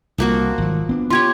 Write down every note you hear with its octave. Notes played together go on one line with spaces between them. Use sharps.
C2 F3 A#3 F#4
G#1 F#3
B3 D4
F4 G4 C#5 C6 G#6